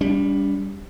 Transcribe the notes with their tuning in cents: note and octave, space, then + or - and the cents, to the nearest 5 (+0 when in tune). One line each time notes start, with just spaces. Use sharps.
G3 +15 D4 -45